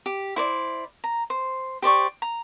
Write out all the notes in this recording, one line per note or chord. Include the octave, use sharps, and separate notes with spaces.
G4
E4 C5 D5
A#5
C5
G4 C5 D5 C#6
A#5